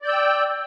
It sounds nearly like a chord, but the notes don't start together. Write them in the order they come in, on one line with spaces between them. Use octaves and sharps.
D5 G6 E6 G5